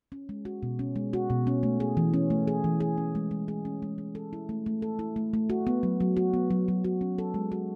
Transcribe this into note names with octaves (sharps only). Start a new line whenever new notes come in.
C#4
G#3
F#4
B2
C#4
G#3
F#4
B2
C#4
A3
G#4
E3
C#4
A3
G#4
E3
G#4
C#4
G#3
G#3
G#4
C#4
G#3
G#3
A4
E4
A3
A3
A4
E4
A3
A3
F#4
B3
F#3
F#3
F#4
B3
F#3
F#3
F#4
C#4
A4
G#3
F#4